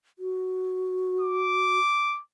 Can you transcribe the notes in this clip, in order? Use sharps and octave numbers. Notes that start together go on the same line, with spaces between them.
F#4
D6